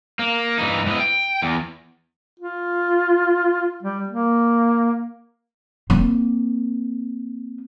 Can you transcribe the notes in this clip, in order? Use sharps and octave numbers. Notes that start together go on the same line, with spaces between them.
A#3
G2 E3 D#4
G#2 E3 B3 E4 D#5
G5
E2
F4
G3
A#3
A#3 C4